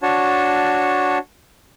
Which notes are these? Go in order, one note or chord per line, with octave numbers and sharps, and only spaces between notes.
D4 F#4 C#5 A5